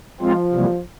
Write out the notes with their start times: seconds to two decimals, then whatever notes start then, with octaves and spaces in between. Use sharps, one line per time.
0.21 F3 G#3 C4 F4
0.53 C3 E3 G3 A#3